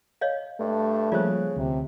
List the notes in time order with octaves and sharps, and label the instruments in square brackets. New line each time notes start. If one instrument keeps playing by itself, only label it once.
[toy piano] C#5 D#5 F5
[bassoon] G2 [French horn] A3
[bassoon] C#3 [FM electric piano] F3 G3 A#3 [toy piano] F4 C5
[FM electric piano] D2 [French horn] C3